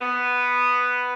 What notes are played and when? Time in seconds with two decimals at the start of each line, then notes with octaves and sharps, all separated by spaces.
0.01 B3